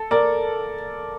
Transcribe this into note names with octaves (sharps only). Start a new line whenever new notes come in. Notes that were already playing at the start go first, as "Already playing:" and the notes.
Already playing: A4
A#4 D5